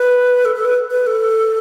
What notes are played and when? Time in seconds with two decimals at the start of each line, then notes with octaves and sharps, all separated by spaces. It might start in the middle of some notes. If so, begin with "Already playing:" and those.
Already playing: B4
0.45 A4
0.56 A4
0.65 B4
0.91 B4
1.07 A4